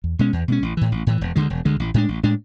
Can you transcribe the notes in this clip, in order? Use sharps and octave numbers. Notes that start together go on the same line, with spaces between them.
E2
B2 G#3 C#4
E2
B2 G#3 C#4
A1
A2 E3
A1
A2 E3
E1
D2 D3 G#3
E1
D2 D3 G#3
A1
A2 G#3 D4
A1
A2 G#3 D4